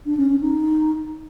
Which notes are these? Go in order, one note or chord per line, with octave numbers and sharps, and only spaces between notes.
D4
C#4
C#4
D#4